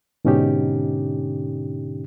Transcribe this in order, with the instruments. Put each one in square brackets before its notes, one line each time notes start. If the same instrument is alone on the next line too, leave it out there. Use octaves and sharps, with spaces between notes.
[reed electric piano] G#2 B2 D3 C#4 D#4 G4